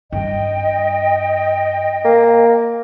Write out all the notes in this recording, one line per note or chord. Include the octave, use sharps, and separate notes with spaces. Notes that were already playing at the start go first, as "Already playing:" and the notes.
G2 D#5 G5
A#3